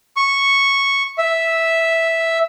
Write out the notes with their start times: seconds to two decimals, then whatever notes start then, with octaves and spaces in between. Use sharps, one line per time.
0.16 C#6
1.18 E5